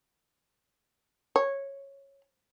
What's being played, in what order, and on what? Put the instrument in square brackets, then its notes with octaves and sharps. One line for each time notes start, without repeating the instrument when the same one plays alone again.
[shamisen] C#5